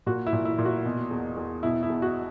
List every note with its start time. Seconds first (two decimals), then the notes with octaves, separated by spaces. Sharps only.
0.06 A#2 F#4
0.27 E4
0.33 A#2
0.45 E4
0.58 A#2
0.65 F#4
0.85 B2
1.11 E2
1.37 E2
1.63 B2 E4
1.83 E4
1.90 E2
2.02 F#4